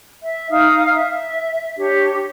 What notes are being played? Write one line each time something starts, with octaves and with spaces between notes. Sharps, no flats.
E5
D#4 F5 D#6 F6
E5
D4 G4 C#5